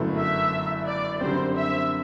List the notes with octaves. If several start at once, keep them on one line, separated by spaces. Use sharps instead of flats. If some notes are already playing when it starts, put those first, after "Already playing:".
Already playing: G1 F#2 F#3 A3 E4
E5
D5
F#2 D3 G3 C4 C5
E5